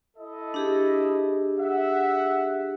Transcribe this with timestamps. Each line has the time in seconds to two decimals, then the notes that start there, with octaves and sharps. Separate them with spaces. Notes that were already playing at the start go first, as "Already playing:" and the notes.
0.17 E4 A4 D#5
0.54 D4 G4 G#4
1.60 E5 F#5